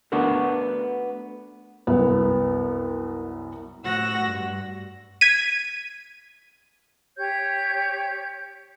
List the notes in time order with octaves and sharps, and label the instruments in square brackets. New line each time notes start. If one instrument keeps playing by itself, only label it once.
[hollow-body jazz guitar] A3 B3 D4 F#4 A4 A#4
[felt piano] C2 F#2 B3
[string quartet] A2 F#4 F#5 E6 A#6
G2
[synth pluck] G#6 B6 D#7
[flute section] G4 C#5 G6